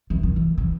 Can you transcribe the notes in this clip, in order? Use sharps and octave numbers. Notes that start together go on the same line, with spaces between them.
E3
D#3
E3
E3